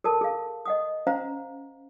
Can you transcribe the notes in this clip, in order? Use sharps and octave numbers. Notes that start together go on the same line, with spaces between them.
A4 A#4 A5
G#4 F5
D#5 F#5 D#6
C#4 C5 F5 F#5 A#5